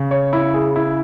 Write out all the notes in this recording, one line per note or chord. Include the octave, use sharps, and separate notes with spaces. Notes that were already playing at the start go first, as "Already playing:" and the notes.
Already playing: C#3
C#5
E4
G#4
E4